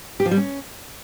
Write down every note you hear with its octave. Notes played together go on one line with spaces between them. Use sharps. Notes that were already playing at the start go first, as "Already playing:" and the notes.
G4
F3
G3
C#4